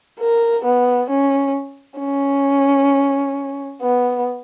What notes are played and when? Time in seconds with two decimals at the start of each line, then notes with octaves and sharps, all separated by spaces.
0.20 A#4
0.65 B3
1.10 C#4
2.00 C#4
3.82 B3